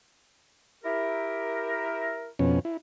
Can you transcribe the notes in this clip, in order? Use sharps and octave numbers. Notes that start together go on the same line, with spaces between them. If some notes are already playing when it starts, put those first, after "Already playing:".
E4 G4 A#4
F2 B2 C#4
E4